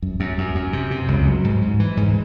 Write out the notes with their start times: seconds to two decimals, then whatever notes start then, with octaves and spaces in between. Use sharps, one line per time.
0.02 F#2
0.20 F#2
0.38 F#2
0.55 F#2
0.73 C3
0.91 C3
1.08 C#2
1.27 F#3
1.44 G#2
1.62 G#2
1.80 E3
1.97 G#2